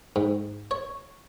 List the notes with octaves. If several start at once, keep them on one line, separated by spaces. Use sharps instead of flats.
G#2
C#5